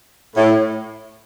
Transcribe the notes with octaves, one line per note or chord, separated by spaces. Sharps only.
A2